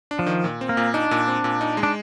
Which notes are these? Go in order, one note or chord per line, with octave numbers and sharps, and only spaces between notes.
D4
F3
D#3
A#2
C4
A#3
A#2
D4 D#4
A#2
C4
A#2
D#4
G#3
D4